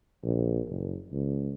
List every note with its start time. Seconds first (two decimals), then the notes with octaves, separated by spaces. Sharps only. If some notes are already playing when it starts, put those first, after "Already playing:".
0.24 A#1
0.69 F#1
1.12 C#2